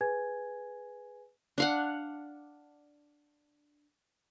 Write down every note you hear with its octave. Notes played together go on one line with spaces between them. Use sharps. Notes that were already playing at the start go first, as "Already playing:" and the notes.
G#4 B4 G#5 G#6
D4 F5 F#5